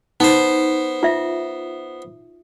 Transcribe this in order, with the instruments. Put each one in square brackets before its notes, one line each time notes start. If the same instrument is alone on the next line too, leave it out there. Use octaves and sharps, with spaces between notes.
[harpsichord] B3 C5 [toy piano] D#4
[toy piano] F4 E5